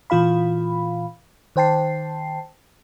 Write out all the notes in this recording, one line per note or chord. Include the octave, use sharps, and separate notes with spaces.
A#2 E3 F4 F5 B5
D#3 C5 G5 A5 C7